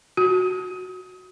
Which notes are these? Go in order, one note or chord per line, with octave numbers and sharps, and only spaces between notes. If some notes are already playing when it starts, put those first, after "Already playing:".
F#4